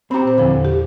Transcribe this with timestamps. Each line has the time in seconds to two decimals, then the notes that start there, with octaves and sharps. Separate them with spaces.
0.11 C4 G4 A#5 B5
0.25 A#2 C5
0.38 E2 D3 F3 B5
0.65 G4